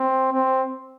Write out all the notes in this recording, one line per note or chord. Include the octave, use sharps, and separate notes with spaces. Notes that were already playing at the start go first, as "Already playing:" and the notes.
Already playing: C4
C4